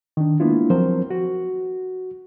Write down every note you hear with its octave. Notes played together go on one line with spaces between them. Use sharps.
D#3 D4
G#3 A#3 B3 D4 E4 F4
F3 F#3 C4 A#4 C5
F#4